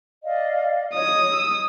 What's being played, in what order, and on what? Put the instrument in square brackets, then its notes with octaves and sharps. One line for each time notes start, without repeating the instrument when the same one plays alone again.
[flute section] D5 D#5 F5
[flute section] C#5 D#5 [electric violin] D#6
[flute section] E6